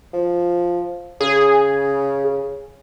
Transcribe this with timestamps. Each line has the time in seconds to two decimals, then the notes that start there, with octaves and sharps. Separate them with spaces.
0.13 F3
1.21 C#3 G#4